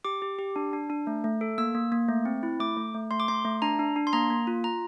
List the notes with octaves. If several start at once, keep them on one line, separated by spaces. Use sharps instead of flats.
G4 D6
G4
G4
D4
D4
D4
A3
A3
A4
A#3 E6
A#3
A#3
A3
C4
E4
A3 D6
A3
A3
A3 C6
D6
A3 C6
A3
D4 A#5
D4
D4
C6
A#3 A#5
A#3
F4
F4 A#5